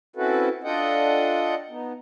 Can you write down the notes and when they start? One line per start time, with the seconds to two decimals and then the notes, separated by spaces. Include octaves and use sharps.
0.16 C4 C#4 E4 F#4 A4 B4
0.64 D4 F4 A4 D#5 F#5 G5
1.70 B3 D#4